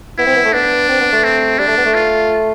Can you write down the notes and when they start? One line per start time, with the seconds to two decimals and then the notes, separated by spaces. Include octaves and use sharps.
0.18 B3 E4
0.27 C4
0.36 B3
0.45 A3
0.53 B3 D4
0.89 C4
1.00 B3
1.13 A3
1.24 C4
1.59 G3 D4
1.68 A3
1.77 B3
1.85 A3
1.95 F4